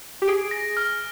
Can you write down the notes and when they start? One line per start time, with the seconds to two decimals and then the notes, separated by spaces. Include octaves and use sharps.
0.22 G4
0.28 G#4 D7
0.51 A#6
0.77 F6